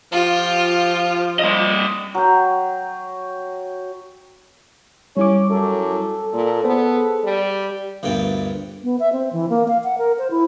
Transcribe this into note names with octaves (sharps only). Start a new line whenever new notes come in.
F3 F4 G4
G3 D#5
F#3 G5
G3 C#4 E4 C#5 D6
F#2 A4
A#2
B3 G#4 B4 C5
G3
D2 G2 A#2 B3 G5
B3
E5
C4
E3
A#3
F5
F#5
A#4
C5
E4